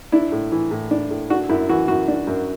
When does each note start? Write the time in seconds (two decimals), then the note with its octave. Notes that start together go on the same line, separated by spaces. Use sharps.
0.12 D4 E4
0.32 A2
0.52 E3
0.71 A2
0.91 D4
1.10 A2
1.30 D4 F#4
1.49 F#2 E4
1.69 E3 F#4
1.88 F#2 F#4
2.08 D4
2.27 F#2